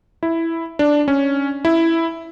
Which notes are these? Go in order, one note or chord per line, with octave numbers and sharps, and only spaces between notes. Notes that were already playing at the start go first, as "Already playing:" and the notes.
E4
D4
C#4
E4